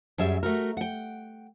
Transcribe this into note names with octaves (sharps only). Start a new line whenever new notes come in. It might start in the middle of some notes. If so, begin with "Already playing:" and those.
F#2 G3 G#4 E5
A3 F#4 A#4
F#5 G5